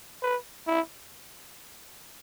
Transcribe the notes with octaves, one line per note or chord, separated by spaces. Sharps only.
B4
E4